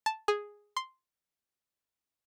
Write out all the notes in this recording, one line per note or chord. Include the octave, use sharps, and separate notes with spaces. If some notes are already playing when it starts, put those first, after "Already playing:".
A5
G#4
C6